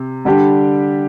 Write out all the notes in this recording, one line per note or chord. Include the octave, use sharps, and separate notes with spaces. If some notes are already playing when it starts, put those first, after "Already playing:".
Already playing: C3
D3 G3 D4 G4